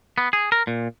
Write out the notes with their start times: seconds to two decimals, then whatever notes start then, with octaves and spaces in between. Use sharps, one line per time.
0.18 B3
0.33 G#4
0.52 A#4
0.67 A#2